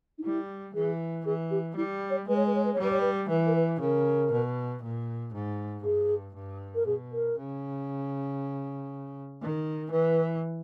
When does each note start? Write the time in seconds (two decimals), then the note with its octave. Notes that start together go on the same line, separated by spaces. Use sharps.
0.18 D#4
0.24 G3 E4
0.74 E3 G#4
1.26 E3 G#4
1.51 G4
1.76 G3 E4
2.10 C#5
2.28 G#3 B4
2.36 C#5
2.47 B4
2.55 C#5
2.65 B4
2.73 C#5
2.79 G3 B4
2.91 C#5
3.01 B4
3.29 E3 B4
3.46 A#4
3.55 B4
3.81 C#3 A#4
4.32 B2
4.82 A#2
5.34 G#2
5.84 G2 G#4
6.35 G2
6.75 A#4
6.86 B2 G#4
7.12 A#4
7.37 C#3
9.41 D#3
9.91 E3 B4